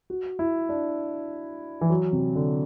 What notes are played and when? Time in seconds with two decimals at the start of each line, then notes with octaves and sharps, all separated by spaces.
0.10 F#4
0.39 E4
0.69 D4
1.81 E3
1.90 F#3
2.13 C3
2.35 D3